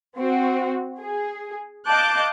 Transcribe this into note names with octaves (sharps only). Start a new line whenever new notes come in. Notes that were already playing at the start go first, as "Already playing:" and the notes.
C4 F#4
G#4
D#5 F5 A5 D6 F#6 G6